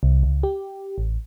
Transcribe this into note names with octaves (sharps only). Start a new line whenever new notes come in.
C2
C#2
G4
A1